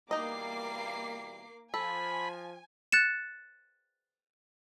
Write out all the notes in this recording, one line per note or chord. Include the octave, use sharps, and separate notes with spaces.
B2 E3 G3 A#3 D#4 D#5 D6 C7
F3 A4 G#5 B5
F#6 A6 C#7 E7